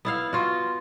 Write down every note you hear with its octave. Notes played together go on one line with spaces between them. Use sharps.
B3 E4 F5
F4 F#4